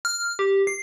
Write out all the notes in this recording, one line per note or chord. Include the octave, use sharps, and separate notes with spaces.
F6
G4
C7